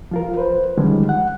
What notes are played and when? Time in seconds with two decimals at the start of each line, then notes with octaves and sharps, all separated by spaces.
0.11 F3 F4 A#4
0.37 B4 C5
0.78 D3 D#3 F3 G3 G#3 C#4
1.09 F#5